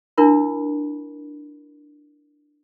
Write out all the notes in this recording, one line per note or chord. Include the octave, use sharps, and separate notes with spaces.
D4 E4 A#4 B5